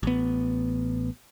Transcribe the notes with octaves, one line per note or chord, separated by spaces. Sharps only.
A1 B3